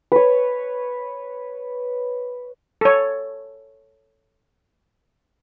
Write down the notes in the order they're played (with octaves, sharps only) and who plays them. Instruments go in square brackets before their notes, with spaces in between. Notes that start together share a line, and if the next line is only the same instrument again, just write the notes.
[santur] B4 C#5
[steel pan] A4 C#5